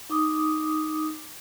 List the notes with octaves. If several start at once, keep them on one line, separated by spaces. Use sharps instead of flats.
D#4 D6 D#6